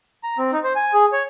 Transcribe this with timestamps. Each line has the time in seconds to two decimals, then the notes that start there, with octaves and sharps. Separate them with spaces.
0.23 A#5
0.38 C4
0.52 D#4
0.64 C5
0.75 G#5
0.93 G#4
1.12 C#5